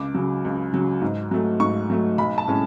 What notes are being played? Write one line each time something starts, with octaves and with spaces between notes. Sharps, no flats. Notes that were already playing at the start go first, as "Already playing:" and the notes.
Already playing: C#2 D6
C#3 F#3
C#2
C#3 F#3
G#2
F#3 A3
G#2 C#6
F#3 A3
B1 B5
A5
A2 G#3 C#4